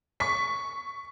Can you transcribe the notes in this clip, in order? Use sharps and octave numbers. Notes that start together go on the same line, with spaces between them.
C#6 B6